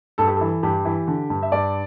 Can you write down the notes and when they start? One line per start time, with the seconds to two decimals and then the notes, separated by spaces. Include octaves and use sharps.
0.18 G2 A4
0.28 G4
0.36 E3 A4
0.63 G2 G4
0.85 E3
1.08 D3
1.30 G2
1.43 E5
1.52 G2 D5